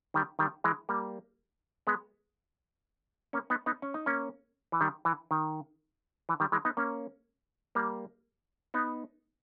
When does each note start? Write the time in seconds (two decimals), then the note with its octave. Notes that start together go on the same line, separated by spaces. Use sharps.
0.14 D#3 G3
0.39 D#3 G3
0.64 E3 G#3
0.89 G3 A#3
1.87 G#3 B3
3.33 A#3 C#4
3.50 B3 D#4
3.66 B3 D#4
3.82 C#4
3.94 D#4
4.06 A#3 C#4
4.72 E3
4.81 D#3 G3
5.05 E3
5.31 D#3
6.29 E3
6.40 D#3 G3
6.52 E3 G#3
6.65 B3 D#4
6.77 A#3 C#4
7.75 G3 A#3
8.74 B3 D#4